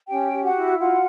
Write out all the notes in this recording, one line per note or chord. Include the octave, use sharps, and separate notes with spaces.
C#4 G4 G5
G4
F#4 F#5
E4
F4 F#4 F#5